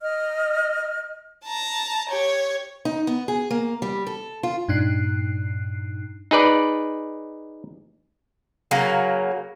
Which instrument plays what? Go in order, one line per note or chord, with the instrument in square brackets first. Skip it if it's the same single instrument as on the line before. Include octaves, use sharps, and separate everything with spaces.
[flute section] D#5 F6
[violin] A5 A#5
G4 C#5
[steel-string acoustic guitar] D#4
B3
G#4
A#3
G3
A4
F4
[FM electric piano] G2 A#2 D4 D#4 F#6 C7
[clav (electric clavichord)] D#4 G#4 B4 D5
[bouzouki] C#3 F#3 A#3